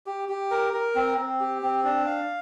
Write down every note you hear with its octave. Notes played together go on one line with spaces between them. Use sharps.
G4
G4
A#4
A#4
C4
C4
G4
C4
D4
F5